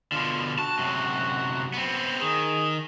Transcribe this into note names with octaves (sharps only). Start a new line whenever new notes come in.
B2 D3 F4
F#4 A5
F#2 C3
B3 C4
D#3 G#4